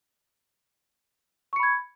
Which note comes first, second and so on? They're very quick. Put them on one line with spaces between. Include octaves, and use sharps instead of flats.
C#6 C#7 B5 G#6